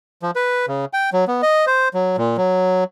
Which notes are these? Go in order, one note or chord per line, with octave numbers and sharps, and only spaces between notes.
F3
B4
C#3
G5
F#3
B3
D#5
C5
F#3
A#2
F#3